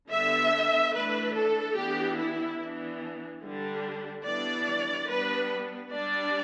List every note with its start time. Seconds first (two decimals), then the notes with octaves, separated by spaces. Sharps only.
0.11 D3 G3 B3 D4 E5
0.93 E3 A3 D4 B4
1.35 A4
1.76 E3 B3 D4 G4
2.18 E4
2.60 E3 B3 D4
3.43 D3 G3 D4
4.26 E3 G3 B3 D4 D5
5.09 G3 B3 D4 B4
5.92 G3 D4 D5